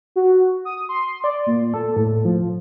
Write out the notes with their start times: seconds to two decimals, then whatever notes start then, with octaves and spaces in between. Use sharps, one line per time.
0.16 F#4
0.65 D#6
0.89 C6
1.24 D5
1.46 A#2
1.74 A4
1.96 A2
2.25 F3